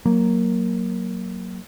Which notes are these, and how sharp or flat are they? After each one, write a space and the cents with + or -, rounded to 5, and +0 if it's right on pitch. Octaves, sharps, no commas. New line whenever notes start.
F#3 +5 A#3 +0